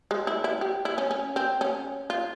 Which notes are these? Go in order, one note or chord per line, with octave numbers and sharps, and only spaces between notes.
G#3
E4
E4
G4
E4
C#4
C#4
C4
C#4
F4